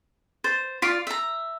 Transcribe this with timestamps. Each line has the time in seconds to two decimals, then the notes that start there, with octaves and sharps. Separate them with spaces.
0.44 C5 A6
0.82 F4 D5 D6 B6 D7
1.07 E5 A#5